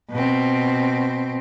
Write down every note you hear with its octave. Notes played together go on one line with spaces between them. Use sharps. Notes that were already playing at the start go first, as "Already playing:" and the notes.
B2 C4